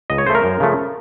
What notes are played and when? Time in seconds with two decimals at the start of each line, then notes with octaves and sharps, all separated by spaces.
0.10 C#2 D#5
0.18 C#5
0.26 C#3 A3 C5
0.35 A#4
0.44 F#2
0.60 C#3 F3 A3